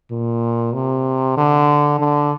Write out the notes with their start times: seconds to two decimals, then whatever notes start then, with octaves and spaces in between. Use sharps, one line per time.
0.11 A#2
0.74 C3
1.37 D3
2.00 D3